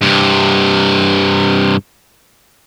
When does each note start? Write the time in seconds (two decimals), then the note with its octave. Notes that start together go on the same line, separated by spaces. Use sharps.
0.01 G2 C3